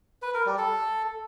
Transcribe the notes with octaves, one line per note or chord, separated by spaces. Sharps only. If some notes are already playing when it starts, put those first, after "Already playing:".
B4
A#4
G3
A4